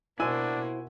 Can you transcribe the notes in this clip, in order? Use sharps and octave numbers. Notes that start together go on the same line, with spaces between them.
B2 A#3 D4 E4 F#4 C5 G#5 E6